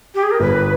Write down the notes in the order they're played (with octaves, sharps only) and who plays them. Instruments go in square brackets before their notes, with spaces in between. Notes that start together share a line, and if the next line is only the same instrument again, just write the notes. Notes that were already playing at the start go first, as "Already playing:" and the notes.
[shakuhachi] G4
G#4
A#4
[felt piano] G1 [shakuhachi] B4